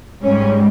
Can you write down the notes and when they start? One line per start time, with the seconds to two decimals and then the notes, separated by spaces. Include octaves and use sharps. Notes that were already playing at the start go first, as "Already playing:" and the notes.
0.21 G#2 G3 C#4